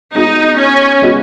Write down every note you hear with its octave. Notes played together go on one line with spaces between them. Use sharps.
G#3 B3 D#4 F#4 D#5
C#4
G#3 B3 F#4 D#5